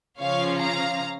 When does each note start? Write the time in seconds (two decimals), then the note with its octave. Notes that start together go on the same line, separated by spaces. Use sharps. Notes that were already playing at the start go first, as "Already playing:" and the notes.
0.19 C#3 F3 C#4 C#5 F5
0.60 F5 A#5